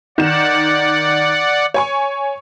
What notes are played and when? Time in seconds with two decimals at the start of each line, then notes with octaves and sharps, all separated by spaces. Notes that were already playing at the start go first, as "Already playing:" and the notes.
0.18 D#3 D5 F#5 E7
1.74 C#5 G#5 C#6